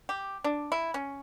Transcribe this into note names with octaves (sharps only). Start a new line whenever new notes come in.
G4
D4
E4
C#4